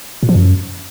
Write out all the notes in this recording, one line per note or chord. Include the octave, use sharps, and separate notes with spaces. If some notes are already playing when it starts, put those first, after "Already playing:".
A#2
F3
F#2